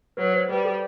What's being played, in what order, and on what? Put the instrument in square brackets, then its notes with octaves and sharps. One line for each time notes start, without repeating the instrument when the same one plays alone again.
[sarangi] F#3 [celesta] B4
[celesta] C5
[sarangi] G3 [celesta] B4
[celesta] A4